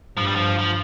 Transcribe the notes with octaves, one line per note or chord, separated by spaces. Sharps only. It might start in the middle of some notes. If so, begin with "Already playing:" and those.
G2 F3
G3
F3
F3